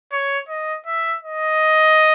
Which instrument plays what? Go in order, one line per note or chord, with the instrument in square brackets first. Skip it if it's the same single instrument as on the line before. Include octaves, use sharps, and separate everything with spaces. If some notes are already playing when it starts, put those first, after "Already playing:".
[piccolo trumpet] C#5
D#5
E5
D#5